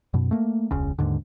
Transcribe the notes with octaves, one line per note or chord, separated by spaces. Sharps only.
F#2 B2
A3 A#3
E1 C#2 C#3
D#2 G#2 D3